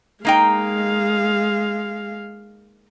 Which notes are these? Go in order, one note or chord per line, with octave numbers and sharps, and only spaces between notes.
G#3 A#3 D#4 F5 G5